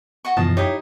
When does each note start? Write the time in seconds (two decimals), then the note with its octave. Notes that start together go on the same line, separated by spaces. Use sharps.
0.25 F#4 D#5 C#6
0.37 C#2 F#2 B2 E3 F3 D#5 A5
0.57 D#4 E4 G4 C#5 D#5